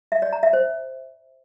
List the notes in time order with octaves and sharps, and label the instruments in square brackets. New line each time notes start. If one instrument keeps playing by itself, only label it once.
[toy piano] E5
D5
A#5
E5
C5